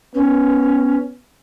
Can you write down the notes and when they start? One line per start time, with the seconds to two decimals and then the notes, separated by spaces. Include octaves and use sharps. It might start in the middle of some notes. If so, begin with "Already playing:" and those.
0.14 B3 C#4